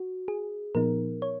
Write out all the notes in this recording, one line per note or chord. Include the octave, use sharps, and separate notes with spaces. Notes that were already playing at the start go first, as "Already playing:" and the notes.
Already playing: F#4
G#4
A#2 F3 B3 D#4 A#4
C#5